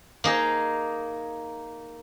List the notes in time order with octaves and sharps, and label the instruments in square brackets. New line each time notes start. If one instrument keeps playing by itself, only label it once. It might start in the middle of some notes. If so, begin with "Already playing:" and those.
[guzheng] A#3 D#4 G#4